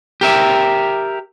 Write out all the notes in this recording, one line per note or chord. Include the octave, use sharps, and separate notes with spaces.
G4 A#4 E5